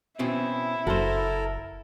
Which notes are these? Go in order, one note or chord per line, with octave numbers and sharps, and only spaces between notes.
B2 C4 C#4 E4
F#1 F#4 A4 A#4 C5